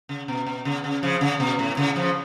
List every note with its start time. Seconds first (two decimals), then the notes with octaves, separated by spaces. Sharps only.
0.09 C#3
0.28 B2
0.47 B2
0.65 C#3
0.84 C#3
1.03 C#3 F3
1.21 C#3
1.40 B2
1.59 A2
1.77 C#3
1.96 C#3 F3